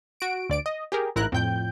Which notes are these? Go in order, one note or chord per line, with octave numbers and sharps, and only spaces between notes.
F#4 D7
D2 D5 D7
D#5
G4 G#4 A#4
A1 G#2 E4 A#4 A#5 F#6
F2 A2 G5 G6